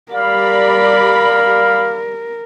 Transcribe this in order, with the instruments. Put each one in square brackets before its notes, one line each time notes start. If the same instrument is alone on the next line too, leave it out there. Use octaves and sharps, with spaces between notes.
[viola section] G3 D5 B5 [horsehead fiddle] A#4 [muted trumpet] F5